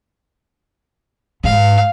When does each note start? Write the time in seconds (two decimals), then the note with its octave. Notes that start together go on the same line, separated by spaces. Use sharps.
1.44 G#2 F5